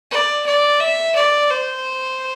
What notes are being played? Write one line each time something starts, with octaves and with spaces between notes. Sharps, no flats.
D5
D5
E5
D5
C5